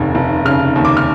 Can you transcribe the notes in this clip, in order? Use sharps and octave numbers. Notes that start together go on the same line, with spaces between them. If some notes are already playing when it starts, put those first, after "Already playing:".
Already playing: F1 D#2 C#3
F1
C#3 F6
D#2
D6
F6